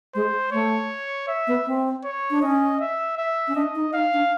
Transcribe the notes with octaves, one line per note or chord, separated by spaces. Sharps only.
G#3 C5
A3 C#5
E5
B3
C4
C#5
D4
C#4 D#5
E5
E5
C#4
D4 D#5
D#4
D#4 F5
D4